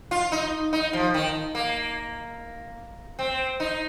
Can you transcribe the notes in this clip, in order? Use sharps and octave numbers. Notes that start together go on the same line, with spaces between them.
F4
D#4
D#4
F3
D#3
A#3
C4
D#4